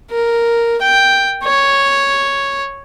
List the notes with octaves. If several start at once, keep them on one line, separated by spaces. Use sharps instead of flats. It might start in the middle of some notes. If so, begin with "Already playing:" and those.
A#4
G5
C#5